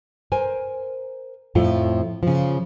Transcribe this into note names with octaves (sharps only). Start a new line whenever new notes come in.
A#4 C5 G#5
F2 A2 F3 A3 F4
C#3 F3